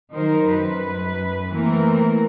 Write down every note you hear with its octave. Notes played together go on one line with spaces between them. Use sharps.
D#3 F#3 D#4 A#4 C5
F#2 B4
E3 A3 A#3 C4 A#4